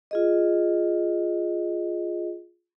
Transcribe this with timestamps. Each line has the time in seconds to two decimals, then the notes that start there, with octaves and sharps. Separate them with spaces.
0.11 F4 G#4 D#5